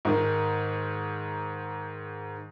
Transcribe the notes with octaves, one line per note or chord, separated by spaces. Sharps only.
G#2 D#3